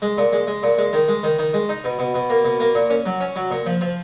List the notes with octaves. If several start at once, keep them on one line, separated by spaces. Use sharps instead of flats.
G#3
A#2
G#3
G#3
A#2
G#3
D#3
G#3
D#3
D#3
G#3
D#4
B2
B2
B2
A#3
B2
A#3
A#2
C#4
F#3
C#4
F#3
A#2
F3
F3